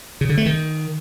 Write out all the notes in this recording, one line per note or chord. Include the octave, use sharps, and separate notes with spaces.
C#3
D3
A3
D#3